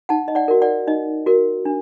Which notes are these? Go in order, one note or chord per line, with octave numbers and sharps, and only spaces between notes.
D#4 F#5 A5
D#5
D5 F#5
F#4 A#4
D5 F#5
D#4 D#5
F#4 A#4
D4